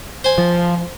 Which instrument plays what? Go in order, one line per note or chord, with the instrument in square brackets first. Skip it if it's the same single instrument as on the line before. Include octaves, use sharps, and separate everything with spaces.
[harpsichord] C5 G#5
[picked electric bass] F3